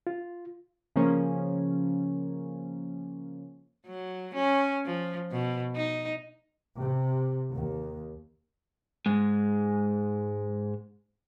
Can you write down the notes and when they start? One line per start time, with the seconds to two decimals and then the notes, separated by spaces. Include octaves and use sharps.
0.07 F4
0.96 C#3 F3 A#3 C#4
3.87 F#3
4.35 C#4
4.86 F3
5.31 B2
5.76 D#4
6.78 C3
7.52 D#2
9.06 G#2 G#3